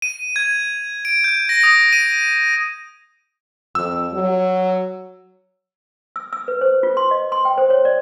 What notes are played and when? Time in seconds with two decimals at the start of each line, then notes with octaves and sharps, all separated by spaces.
0.02 D#7
0.36 G#6
1.05 D7
1.24 G6
1.49 A#6
1.63 D#6
1.93 D#7
3.75 F2 E6
4.13 F#3
6.16 E6
6.33 E6
6.48 B4
6.61 C5
6.83 F4
6.97 C6
7.11 D#5
7.32 C6
7.45 G5
7.58 C5
7.70 C#5
7.85 D5